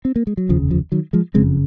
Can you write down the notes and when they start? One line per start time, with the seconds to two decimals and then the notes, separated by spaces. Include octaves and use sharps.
0.05 C4
0.16 A#3
0.27 G#3
0.37 F#3
0.49 F1 D#2 C#3 F3
0.71 F3
0.92 D#3 F#3
1.13 F3 G#3
1.34 F#1 F2 C#3 G#3 C4